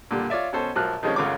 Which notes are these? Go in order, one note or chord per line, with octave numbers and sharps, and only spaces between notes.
A#2 D3 G3
F4 C#5 D5 E5
B2 C#4 A4 C5
A#1 F3 F#3 F6 F#6
D#3 F3 G3 G#3 C4 C#4
A1 F#2 C#3 F4 C#5 D6